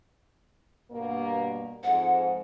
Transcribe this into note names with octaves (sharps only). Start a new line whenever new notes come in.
G2 B2 A#3
F2 G#2 F#5